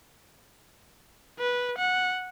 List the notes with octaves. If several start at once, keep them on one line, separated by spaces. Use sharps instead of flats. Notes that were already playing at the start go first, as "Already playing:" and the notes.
B4
F#5